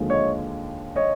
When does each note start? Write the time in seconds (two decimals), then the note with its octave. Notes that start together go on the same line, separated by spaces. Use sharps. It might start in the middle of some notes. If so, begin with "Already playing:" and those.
Already playing: D#2 D3 F3 G#3
0.10 C#5 D#5
0.96 C#5 D#5